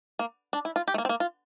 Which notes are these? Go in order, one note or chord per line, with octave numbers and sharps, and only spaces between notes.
A#3
D4
E4
F4
G4
A3
A#3
C4
A#3
F4